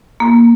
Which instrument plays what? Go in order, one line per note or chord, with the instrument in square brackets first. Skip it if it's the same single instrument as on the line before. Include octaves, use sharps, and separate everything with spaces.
[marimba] A#3